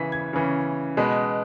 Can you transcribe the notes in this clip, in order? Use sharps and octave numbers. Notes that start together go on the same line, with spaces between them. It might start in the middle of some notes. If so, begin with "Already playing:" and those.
Already playing: C#3 E3 C#4 B6
G#6
C#3 E3 C#4
B2 G#3 B3